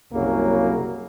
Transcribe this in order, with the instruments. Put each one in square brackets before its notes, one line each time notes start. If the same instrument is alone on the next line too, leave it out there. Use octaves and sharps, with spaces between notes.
[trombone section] C2 F#2 C#3 F#3 A#3